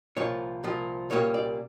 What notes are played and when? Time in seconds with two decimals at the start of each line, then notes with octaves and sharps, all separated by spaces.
0.17 C2 A#2 F3 C#5
0.64 C2 A#2 F3
1.10 C2 A#2 G3 A#3 C#4 C#5
1.34 D5